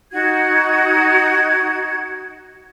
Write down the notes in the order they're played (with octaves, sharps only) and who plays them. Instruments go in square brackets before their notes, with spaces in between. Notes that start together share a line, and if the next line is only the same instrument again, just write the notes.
[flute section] D#4 F#4 G#6